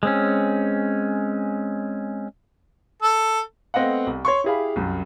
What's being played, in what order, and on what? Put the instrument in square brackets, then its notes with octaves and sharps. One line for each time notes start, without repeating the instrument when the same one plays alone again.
[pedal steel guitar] G#3 C4 C#4
[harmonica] A4
[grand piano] A3 B3 C4 D#5 F5 F#5
C2
C#5 C6 C#6
E4 G4 G#4 F5 B5
C2 F#2